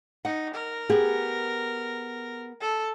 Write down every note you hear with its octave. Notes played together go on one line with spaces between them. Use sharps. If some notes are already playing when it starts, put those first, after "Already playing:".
D#4 F#5
A#4
B3 G4 G#4
A4